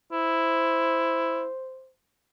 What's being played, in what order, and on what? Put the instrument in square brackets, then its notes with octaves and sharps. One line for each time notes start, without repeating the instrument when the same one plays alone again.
[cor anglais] E4 [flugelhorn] C5